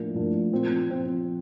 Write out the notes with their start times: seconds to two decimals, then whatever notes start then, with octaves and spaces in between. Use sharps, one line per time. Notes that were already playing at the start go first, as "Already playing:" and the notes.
Already playing: A2 F3 A#3 D4
0.14 A2 F3 A#3 D4
0.52 A#2 F3 C4
0.89 A#2 F3 C4